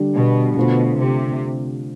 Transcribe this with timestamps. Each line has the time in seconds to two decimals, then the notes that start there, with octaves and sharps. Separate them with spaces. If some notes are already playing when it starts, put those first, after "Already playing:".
Already playing: D3 G3 D4
0.15 B2
0.56 B2 D3 A3 D4 F4 C5
0.98 C3